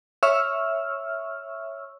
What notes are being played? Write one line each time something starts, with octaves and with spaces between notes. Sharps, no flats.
C#5 E5 C#6 E6 F6